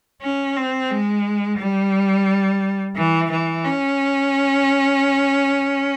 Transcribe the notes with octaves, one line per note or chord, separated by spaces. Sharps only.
C#4
C4
G#3
G3
E3
E3
C#4